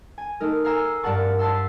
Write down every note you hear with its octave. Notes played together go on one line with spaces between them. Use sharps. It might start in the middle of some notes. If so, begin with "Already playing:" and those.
G#5
A3 D#4 A#4
F5 G#5 A#5 E6
G2 D4 A#4 F#5 A5 C#6
E5 A5 C6 E6